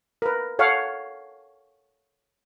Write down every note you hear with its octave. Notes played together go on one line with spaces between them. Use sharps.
A#4 B4
A4 C#5 F5 F#5